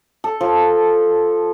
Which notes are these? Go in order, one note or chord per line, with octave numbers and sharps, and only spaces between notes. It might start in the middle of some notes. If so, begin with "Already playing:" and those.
A4
F3